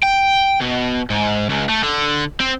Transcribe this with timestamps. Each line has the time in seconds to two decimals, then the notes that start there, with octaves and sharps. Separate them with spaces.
0.03 G5
0.60 B2
1.10 G#2
1.49 C#2
1.69 A3
1.83 D3
2.40 C4